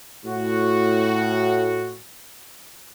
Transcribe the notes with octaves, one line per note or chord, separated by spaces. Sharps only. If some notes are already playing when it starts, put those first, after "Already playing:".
A2 F#4